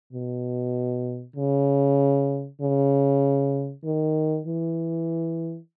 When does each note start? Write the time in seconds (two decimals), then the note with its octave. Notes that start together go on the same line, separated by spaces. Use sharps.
0.13 B2
1.36 C#3
2.61 C#3
3.85 D#3
4.47 E3